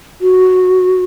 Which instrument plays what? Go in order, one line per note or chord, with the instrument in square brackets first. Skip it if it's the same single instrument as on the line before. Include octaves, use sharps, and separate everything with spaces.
[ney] F#4